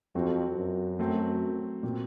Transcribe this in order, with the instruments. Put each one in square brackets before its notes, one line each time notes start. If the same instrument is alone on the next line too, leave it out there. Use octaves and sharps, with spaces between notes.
[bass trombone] F2 [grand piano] F#3 C4 F#4 A4
[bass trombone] F#2
[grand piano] F#3 A3 C4
A#2 F#3 C4